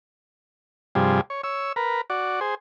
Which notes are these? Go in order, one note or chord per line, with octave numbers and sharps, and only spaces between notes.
G2 C3 F3 G3 G#4
C#5
C#5 E6
A#4 B4
F#4 D5
G#4 C5